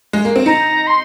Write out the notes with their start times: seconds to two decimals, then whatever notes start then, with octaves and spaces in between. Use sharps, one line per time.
0.13 G#3
0.25 A#3
0.36 C4
0.46 D#4 A#5
0.87 C6